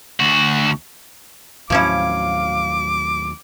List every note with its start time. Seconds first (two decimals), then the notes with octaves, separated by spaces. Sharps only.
0.20 D2 F#4
1.70 D#2 A2 F3 F#3 C#4 E4 F5 D6